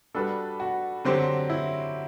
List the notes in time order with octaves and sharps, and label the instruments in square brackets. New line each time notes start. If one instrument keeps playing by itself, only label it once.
[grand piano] G3 D4 F#4 B4 [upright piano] A4
[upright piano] F#4
[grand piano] D3 F#3 C4 G4 C5
[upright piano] E4